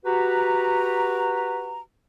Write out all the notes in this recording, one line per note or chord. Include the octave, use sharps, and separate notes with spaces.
F#4 G4 B4 A#5